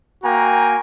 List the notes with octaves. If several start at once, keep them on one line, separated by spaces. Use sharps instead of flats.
A#3 F#4 G5 G#5 A#5